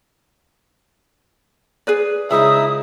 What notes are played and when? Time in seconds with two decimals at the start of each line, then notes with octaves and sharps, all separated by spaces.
1.87 G#4 B4 D5
2.31 C#2 D#4 E4 E5 D#6